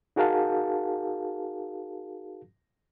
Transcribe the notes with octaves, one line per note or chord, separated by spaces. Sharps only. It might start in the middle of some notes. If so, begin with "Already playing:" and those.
D#4 F#4 G#4 A#4 F5 A5